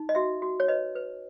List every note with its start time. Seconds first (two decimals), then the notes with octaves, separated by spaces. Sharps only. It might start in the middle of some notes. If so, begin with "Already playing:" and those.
Already playing: D#4
0.09 D#5
0.15 F#4 E5
0.42 F#4
0.60 C#5
0.68 B4 D#5
0.95 B4